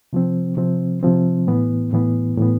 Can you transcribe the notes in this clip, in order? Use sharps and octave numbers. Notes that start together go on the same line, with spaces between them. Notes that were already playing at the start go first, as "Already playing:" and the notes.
C3 F3 C4
C3 F3 C4
C3 F3 C4
A2 E3 B3
A2 E3 B3
A2 E3 B3